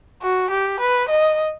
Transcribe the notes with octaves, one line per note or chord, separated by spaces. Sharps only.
F#4
G4
B4
D#5